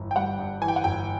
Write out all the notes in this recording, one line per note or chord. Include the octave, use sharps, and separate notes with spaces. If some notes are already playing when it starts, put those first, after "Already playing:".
Already playing: G1 E3
G5
G3 F#5
G2
E3 G#5
G5
F#5
G1 G5